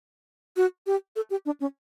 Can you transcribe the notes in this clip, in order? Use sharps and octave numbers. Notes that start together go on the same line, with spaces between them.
F#4
G4
A4
G4
D4
C#4